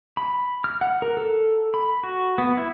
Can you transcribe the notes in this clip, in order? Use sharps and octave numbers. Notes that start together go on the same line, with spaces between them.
B5
F6
F#5
A#4
A4
B5
F#4
B3
E4